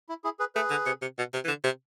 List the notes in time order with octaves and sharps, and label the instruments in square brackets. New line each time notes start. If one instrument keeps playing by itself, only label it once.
[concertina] E4
E4 G#4
G#4 B4
[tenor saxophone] A3 [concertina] G#4 B4
[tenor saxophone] D3
C3
C3
B2
C3
E3
D3
C3